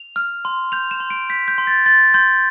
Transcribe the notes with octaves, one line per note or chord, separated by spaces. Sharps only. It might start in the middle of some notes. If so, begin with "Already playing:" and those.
Already playing: F7
F6
C6
G6 F7
E7
C6
D7
G6 B6
G6
C6
A6
C6 A6
C6 G6